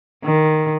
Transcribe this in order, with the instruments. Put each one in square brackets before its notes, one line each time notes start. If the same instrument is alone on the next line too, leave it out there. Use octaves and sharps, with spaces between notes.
[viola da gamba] D#3